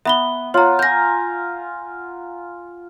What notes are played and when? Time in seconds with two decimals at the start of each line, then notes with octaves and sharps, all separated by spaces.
0.05 B3 E5 B5 G7
0.54 F4 C#5 F#5 A#5
0.79 G#5 A#5 G6 A#6